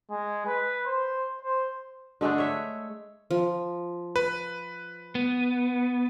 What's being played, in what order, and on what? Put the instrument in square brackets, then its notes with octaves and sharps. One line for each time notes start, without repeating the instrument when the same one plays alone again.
[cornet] G#3
B4
C5
C5
[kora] D3 G#3 A3 D4
C#5 E5
[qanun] F3
[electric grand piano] B4
[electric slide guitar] B3